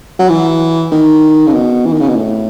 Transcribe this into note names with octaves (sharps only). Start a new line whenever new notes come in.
F#3
E3
D#3
C#3
B2
E3
D#3
C#3
B2
A2